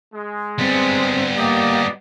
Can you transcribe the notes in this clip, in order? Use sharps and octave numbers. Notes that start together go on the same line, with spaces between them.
G#3
G3 B3 C4
A#3 G4 D5 D#5